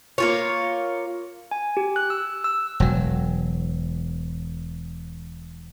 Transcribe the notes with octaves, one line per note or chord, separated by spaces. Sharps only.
A#3 F4 C#5
G#5
G4
F#6
E6
E6
E1 F#3